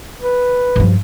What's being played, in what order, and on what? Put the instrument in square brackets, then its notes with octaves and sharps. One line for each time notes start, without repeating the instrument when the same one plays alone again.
[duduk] B4
[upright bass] G2 F3